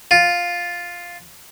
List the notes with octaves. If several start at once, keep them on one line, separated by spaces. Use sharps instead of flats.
F4